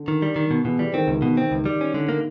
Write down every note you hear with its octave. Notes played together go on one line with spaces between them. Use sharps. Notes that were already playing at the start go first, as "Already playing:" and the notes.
Already playing: D3
D#3
G3
D#3
B2
B2 E3
E3 G3
D#3 C4
C#2
B2
C4
C#2
G3
C#4
D3
A#3